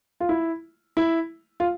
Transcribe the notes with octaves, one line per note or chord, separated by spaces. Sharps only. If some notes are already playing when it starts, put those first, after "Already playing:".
F4
E4
E4
F4